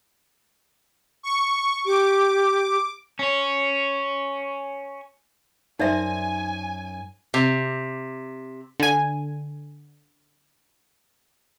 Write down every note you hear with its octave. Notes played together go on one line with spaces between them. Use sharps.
C#6
G4 D6
C#4 C#5
F#2 D#4 C5 D5 E5 G#5
C3
D3 G#5